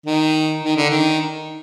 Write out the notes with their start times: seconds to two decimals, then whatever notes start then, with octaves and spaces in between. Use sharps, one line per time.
0.06 D#3
0.64 D#3
0.77 D3
0.89 D#3